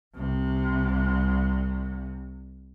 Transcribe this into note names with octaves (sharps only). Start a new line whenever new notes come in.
C2 C3